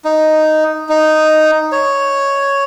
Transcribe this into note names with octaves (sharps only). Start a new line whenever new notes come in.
D#4
D#4
C#5